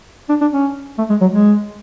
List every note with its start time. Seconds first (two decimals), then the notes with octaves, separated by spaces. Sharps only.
0.29 D4
0.41 D4
0.53 C#4
0.98 A3
1.09 G#3
1.21 F#3
1.32 G#3